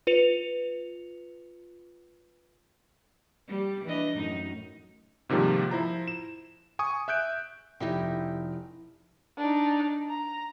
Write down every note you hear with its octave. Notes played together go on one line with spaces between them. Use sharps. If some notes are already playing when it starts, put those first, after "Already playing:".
F4 B4 C#7 F7
G3
E3 D4 D#5
F#2 A2 D#4
G#2 C3 D#3 F3 G3 A#3
F3 E4 C5 A#5
E7
G#5 C#6 D#6
E5 F#6 G6 D7
F1 D#4 E4 G4
D4 D#4
A#5